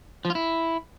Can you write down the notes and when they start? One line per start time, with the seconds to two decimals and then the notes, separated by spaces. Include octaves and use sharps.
0.25 F3
0.30 F4
0.35 E4